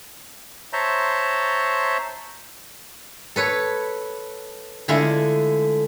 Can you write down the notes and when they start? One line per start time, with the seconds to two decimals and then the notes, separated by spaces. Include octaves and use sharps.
0.73 C5 C#5 E5 A5 A#5 C6
3.36 A4 B4 C#5
4.88 D3 G#3 A3 E4 F4